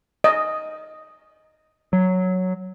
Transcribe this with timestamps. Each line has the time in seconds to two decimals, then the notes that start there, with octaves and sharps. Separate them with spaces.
0.24 D#5
1.93 F#3